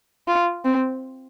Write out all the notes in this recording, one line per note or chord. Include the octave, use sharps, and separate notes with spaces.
F4
C4